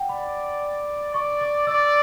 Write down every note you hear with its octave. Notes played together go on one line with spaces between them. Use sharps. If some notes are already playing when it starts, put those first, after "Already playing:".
Already playing: F#5 G5
D5 B5
D5 C#6
D6
D5 E6